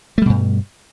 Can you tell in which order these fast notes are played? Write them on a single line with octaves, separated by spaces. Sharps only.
A3 G3 B2 G2